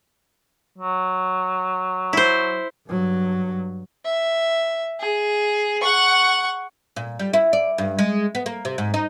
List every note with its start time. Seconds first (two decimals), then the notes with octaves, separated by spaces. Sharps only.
0.78 F#3
2.13 E4 C5
2.87 G2 F#3
4.05 E5
5.00 G#4
5.82 F#5 C#6
6.96 A#2
7.19 G3
7.33 E4
7.53 D5
7.78 G2
7.98 G#3
8.35 B3
8.46 A#3
8.65 C3
8.78 G#2
8.94 D#4